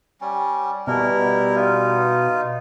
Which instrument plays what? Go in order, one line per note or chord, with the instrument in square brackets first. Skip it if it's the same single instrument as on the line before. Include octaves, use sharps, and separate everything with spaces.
[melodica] G3 C#4
[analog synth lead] B2 [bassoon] G3 [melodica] E4 A#4
[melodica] D#4 F4